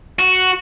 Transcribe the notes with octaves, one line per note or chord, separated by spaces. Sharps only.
F#4